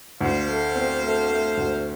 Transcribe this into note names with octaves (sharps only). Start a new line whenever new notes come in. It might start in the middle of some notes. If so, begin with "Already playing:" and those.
D2 C5 F5
A3
C4
A3
A3
D2